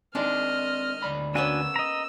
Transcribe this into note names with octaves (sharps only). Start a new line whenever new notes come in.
D#3 G#3 C4 D4 D5 D#5 F6
D2 D5 B5
A#3 B3 C#4 D4 F#4 G#5 E6
D#5 A#5